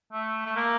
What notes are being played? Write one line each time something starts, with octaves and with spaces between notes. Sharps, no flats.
A3
A3
A#3